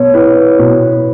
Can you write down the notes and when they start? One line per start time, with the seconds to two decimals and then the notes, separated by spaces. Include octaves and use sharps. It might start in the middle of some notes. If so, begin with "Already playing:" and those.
Already playing: B2 B3 C#5
0.14 E4 B4
0.59 B2